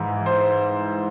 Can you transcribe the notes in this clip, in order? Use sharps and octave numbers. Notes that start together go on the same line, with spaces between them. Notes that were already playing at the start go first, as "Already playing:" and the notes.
Already playing: G#2 E3
C5